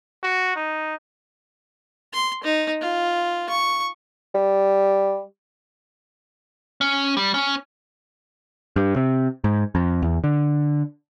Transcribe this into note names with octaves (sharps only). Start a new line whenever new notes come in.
F#4
D#4
C6
D#4
F4
C#6
G3
C#4
G3
C#4
G2
C3
G#2
F2
E2
D3